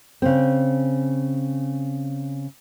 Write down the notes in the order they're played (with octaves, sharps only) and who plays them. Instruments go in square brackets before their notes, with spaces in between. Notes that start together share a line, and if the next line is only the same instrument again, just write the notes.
[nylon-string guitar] C#3 C4